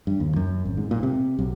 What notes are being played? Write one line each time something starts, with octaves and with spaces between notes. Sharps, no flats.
G2
D#2
F#2
G#1
G#2
A#2
C3
B1